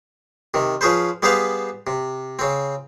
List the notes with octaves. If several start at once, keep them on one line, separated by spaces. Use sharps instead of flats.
C3 D#3
F3 C#4 G#4 B4 C5
G3 B3 G#4 B4 C5 F5
C3
C#3 C4